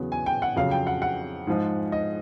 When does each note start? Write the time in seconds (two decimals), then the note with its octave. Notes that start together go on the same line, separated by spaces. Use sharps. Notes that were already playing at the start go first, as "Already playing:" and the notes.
Already playing: E2 C#3 F#3 B3
0.12 G#5
0.26 G5
0.42 F#5
0.56 F2 C#3 F#3 F5
0.71 G5
0.87 F#5
1.02 F#5
1.47 G#2 F3 G#3
1.92 D#5